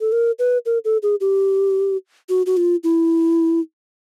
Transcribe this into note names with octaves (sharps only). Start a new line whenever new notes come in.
A4
A#4
B4
A#4
A4
G#4
G4
F#4
F#4
F4
E4